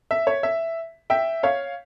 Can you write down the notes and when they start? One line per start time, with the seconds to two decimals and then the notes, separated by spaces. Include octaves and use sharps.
0.11 E5
0.27 C#5
0.43 E5
1.10 E5 G5
1.43 C#5 F5